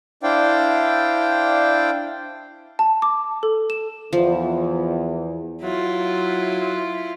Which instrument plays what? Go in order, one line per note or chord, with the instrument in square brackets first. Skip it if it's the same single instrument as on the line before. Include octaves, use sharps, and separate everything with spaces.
[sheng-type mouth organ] D4 E4 C5 D5 F5 G5
[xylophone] A5
D6
A4
E7
[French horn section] E2 [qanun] F3
[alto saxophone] F#3 [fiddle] E4 F4